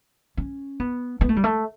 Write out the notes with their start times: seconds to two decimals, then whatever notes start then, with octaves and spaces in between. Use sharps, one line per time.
0.37 C#4
0.80 B3
1.21 B3
1.29 A3
1.36 G3
1.44 A3